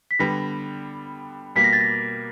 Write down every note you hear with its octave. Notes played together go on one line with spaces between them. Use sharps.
B6
D3 G3 B3 A#6
B2 G3 A#3 B6
A#6
A6
A#6